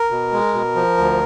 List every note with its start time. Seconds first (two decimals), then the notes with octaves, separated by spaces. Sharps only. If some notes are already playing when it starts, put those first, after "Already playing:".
Already playing: A#4
0.11 B2
0.33 G#3
0.54 B2
0.76 F3
0.97 D2